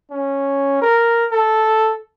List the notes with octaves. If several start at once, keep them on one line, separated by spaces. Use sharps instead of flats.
C#4
A#4
A4